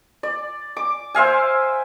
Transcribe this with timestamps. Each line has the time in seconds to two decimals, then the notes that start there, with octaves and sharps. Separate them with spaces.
0.23 D5
0.77 D6
1.15 C5 E5 F5 G#5